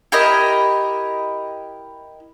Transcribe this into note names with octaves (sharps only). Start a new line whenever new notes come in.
E4 G4 A#4 D#5